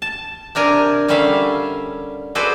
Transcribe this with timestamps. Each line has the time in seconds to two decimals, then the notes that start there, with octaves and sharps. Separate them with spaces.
0.02 A5
0.55 C3 D4 A#4 G#5
1.08 D3 G3 C#4 E5 F5
2.35 F#4 G#4 A4 B4 C5 D5